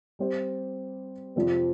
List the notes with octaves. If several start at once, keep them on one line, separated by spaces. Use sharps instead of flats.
G3 C4 G4 C5
F2 C3 F3 G#3 C4